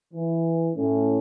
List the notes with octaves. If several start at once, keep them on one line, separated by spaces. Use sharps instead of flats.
E3
A2 A3 C#4